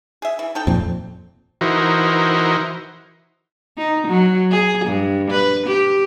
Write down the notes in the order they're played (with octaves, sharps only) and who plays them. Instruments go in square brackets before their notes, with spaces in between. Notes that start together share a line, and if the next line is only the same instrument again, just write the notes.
[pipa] G#4 E5
E3
D#4 A4 G5
[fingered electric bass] F2 A#2 [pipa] C4
[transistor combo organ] E3 D#4 E4 F#4 A#4 C5
[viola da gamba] D#4
F#3
G#4
G2
B4
G4